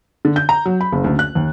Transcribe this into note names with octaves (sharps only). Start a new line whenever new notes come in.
D3
G6
A#5
F#3
B5
F#1
D2
F#6
D#2